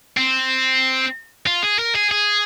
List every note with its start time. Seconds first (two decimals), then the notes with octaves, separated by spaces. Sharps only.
0.17 C4
1.47 F4
1.63 G#4
1.79 A#4
1.95 G#4
2.11 G#4